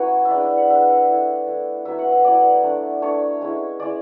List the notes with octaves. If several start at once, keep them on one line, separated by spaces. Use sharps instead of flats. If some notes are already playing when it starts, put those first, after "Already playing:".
Already playing: F#3 B3 C#4 E4 B4 C#5
E5
G#3 B3 D4 D5
E5
F#5
G#3 B3 D4 E5
A3 E4
A3 E4
F#3 B3 E4 E5
F#5
E5
F#3 B3 E4 D5
A3 D4
A3 D4 C#5
G#3 C#4 E4
G#3 C#4 E4 D5